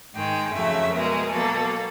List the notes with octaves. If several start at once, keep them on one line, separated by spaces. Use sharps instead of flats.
G#2 D#3 G#3 G5
F2 C#3 F#3 A3 E5
B2 G#3 A#4
B2 F#3 A#3 A4